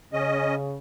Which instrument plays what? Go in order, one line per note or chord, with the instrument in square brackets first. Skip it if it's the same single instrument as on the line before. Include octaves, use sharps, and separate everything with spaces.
[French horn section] C#3 [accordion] C#4 D#5